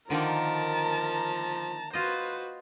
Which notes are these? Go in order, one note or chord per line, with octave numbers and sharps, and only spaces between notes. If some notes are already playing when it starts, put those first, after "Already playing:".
D3 D#3 F3 A#3 A#4 A5 A#5
F4 F#4 B4 C5 D#5